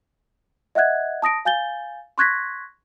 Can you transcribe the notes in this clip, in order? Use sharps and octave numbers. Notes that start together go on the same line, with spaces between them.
D#5 E5 F#5 F#6 G#6
A5 D#6 A#6 D7
F5 G#5 G6 A6 G7
C6 C#6 F#6 G#6 A#6 B6